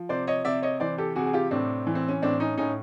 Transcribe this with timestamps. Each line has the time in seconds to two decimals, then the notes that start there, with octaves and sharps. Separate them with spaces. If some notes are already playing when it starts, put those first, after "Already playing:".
Already playing: F3
0.09 C3 C5 D5
0.27 C#5 D#5
0.45 C3 D5 E5
0.62 C#5 D#5
0.80 E3 C5 D5
0.98 G4 A4
1.16 C3 F#4 G#4
1.26 G#4
1.33 F4 G4
1.51 A2 C4 D4
1.87 E3
1.95 C4
2.08 C#4
2.22 A2 C4 D4
2.40 C#4 D#4
2.57 A2 C#4 D#4